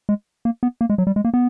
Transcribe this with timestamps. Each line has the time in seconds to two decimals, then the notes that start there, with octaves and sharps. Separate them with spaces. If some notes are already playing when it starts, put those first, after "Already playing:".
0.09 G#3
0.45 A#3
0.63 B3
0.81 A#3
0.90 G#3
0.98 F#3
1.07 G3
1.16 G#3
1.25 A#3
1.34 B3